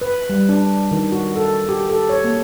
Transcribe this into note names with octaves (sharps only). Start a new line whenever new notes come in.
B4
G3
D4
D#3
F#4
A4
G4
A4
C#5
A#3